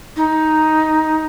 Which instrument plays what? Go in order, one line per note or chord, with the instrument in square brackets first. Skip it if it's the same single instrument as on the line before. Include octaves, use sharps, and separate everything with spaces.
[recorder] D#4